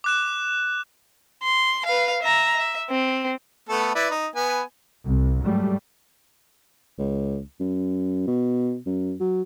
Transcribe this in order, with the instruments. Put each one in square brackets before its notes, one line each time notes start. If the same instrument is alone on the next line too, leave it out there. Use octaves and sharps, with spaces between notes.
[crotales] D6 F#6 E7
[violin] C6
B4 F5
E5 A#5
E5
C4
[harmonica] A3 B3 A4
E4 B4 D5
D#4
B3 B4 G#5
[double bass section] C2
G#2 F#3 G3 A3
[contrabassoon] C#2
F#2
B2
F#2
F#3